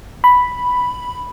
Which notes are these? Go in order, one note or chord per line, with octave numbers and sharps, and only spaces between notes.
B5